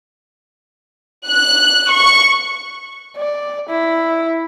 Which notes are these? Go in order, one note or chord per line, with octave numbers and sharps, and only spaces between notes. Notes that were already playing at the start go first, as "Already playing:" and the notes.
F#6
C#6
D5
E4